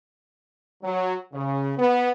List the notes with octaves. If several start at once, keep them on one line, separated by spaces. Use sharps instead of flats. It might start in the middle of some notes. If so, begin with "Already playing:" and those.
F#3
C#3
B3